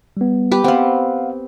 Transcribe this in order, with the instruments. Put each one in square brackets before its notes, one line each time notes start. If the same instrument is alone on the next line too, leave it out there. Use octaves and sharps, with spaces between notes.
[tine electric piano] G3 B3
[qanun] G4 B4
[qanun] B3 C4 [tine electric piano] F5 F#5